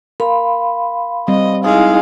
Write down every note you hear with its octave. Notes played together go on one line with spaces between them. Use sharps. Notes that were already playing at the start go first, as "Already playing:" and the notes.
A#4 F5 B5 C6
G3 C4 D#5
G#3 D#4 E4 F5